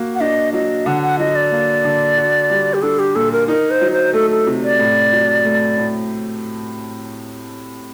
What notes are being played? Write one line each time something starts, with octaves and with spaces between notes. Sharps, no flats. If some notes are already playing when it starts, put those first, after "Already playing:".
Already playing: A#3 F#4
F#5
D4 D#5
F#3 D#5
D3 F#5
F#5
F#3 D#5
D5
A#3
D3
F#4
G3
G4
D4 A4
G4
A#2 A4
A#4
D#4 A#4
C5
F#3
C5
A3 A4
A4
C3
D5
A2
F#3
A3
A2